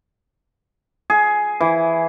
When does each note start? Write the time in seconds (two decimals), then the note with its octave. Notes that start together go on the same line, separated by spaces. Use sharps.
1.10 G#4
1.61 E3